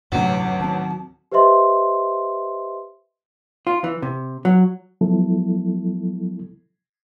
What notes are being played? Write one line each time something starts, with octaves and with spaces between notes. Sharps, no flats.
A1 D2 G2 C3 E3 F#3
D#3 C4 A5
G4 B4 C5 D#5 E5 C6
F4
E3
C3
F#3
F3 F#3 G#3 B3 E4 A4